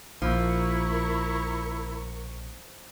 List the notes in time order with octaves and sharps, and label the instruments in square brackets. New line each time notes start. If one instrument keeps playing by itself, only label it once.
[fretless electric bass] A#1 [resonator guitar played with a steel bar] F3 [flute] E4 [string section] A#4 C#6